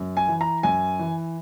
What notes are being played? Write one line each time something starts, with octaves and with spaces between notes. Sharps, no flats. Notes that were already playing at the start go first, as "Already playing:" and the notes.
Already playing: F#2
G#5
E3
A#5
F#2 G#5
E3